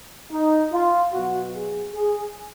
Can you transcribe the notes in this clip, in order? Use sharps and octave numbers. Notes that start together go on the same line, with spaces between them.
D#4
F4
B2 F#3 F#4
G#4
G#4